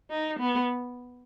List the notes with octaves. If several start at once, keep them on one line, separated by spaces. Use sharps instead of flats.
D#4
B3